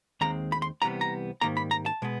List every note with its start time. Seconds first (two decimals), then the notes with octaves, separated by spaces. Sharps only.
0.21 D#2 D#3 G#3 C4 A#5
0.52 B5
0.62 C6
0.82 C2 C3 E3 G3 B3 A#5
1.01 A#5
1.41 G#2 D#3 G3 A#3 A#5
1.57 B5
1.71 A#5
1.86 A5
2.02 B2 G#3 B3